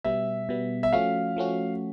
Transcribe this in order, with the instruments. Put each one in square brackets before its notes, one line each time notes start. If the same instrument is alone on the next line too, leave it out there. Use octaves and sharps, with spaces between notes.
[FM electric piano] B2 G3 B3 [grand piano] E5
[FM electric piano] B2 G3 B3
[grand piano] E5
[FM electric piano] F3 A3 C#4 F#4 [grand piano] F5
[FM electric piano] F3 A3 C#4 F#4